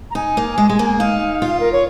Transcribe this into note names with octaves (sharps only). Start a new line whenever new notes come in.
A#5
D#4 G#5
A#3
G#3
G#3
A#3
D#4 F5
F4
A#4
C#5